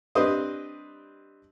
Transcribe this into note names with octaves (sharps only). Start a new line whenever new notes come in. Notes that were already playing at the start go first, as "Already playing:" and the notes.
G3 C4 D4 B4 C5 D#5